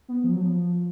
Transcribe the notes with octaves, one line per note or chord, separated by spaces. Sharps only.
B3
F3
F#3
F3